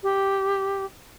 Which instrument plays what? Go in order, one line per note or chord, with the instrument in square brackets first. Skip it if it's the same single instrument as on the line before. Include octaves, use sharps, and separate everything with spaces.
[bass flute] G4